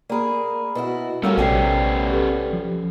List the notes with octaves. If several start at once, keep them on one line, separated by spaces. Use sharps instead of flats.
A#3 G#4 D5 A#5 B5
B2 E4 F#4 B4
G3 A3 B3 C#4 F#4 A#4 F5 E6
A#1 C3 G3 A4 G5 G#5 C7
G4 A4 B4
F3